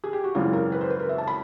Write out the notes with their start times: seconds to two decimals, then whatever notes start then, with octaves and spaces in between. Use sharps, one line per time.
0.04 G#4
0.13 G4
0.24 F#4
0.35 G#1 F#2 C#3 E3 F4
0.53 A#4
0.72 B4
0.81 C5
0.90 B4
0.99 A#4
1.09 E5
1.18 A5
1.27 B5